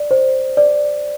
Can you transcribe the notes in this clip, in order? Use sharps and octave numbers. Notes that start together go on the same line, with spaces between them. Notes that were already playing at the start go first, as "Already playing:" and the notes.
Already playing: D5
C5
D5